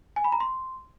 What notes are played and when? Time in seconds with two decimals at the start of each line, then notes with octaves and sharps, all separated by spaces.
0.16 G#5
0.24 B5
0.32 A#5
0.40 C6